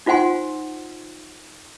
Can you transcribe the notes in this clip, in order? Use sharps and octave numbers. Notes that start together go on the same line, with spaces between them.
D#4 F4 C5 F#5 G#5 C6